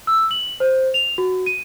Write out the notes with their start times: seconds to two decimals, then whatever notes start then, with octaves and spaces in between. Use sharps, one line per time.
0.07 E6
0.31 F#7
0.60 C5
0.94 F7
1.18 F#4
1.46 D#7